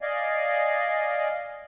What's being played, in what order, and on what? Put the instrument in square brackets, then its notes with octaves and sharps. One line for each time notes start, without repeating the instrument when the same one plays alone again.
[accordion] D5 D#5 F5 G#5